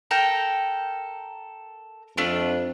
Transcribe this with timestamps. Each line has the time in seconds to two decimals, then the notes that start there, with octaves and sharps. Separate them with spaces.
0.11 A4 A#4 G5
2.17 F2 A3 D4 F4